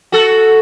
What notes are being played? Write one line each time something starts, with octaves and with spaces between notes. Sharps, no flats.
F#4 A4